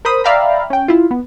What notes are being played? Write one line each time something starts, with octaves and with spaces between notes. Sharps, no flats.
A#4 C5 B5 D#6
D5 E5 F5 G5 A#5 B5
C#4 G5
E4 F4
B3